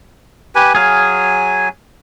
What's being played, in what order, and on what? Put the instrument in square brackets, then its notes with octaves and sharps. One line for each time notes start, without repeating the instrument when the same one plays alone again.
[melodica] G4 B4 G#5
[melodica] F#3 G#5 [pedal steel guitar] G#4 F5